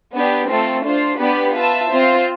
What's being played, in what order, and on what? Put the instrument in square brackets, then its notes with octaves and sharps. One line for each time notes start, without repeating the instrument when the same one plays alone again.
[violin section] B3 D4 G4
A3 C4 F4 A4
D4 F4 C5
B3 D4 G4 B4 D5
F4 B4 E5 A5
C4 F4 C5